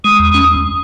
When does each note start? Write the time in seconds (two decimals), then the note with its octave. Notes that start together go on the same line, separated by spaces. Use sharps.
0.04 G#3 D#6
0.19 E2
0.34 C#4